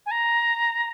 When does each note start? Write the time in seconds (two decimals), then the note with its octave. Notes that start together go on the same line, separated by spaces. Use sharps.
0.06 G#5
0.11 A#5